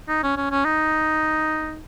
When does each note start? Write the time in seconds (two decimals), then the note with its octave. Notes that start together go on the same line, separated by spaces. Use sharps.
0.08 D#4
0.23 C#4
0.37 C#4
0.51 C#4
0.65 D#4